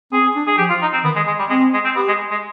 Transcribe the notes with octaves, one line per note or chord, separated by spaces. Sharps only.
C4 G#4
D4
G#4
F3 G4
F4
D#4
C4
D#3 B3
G#3
G#3
G3
G#3 C4
G#3
C4
B3 G4
G#3
G#3